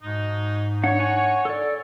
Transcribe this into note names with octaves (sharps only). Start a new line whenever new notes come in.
G#2 B2 G#3 D#4
D4 C#5 F#5
F#5 G#5 A#5
A4 D5